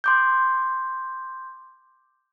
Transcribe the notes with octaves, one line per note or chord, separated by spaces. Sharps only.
C6 D6 G6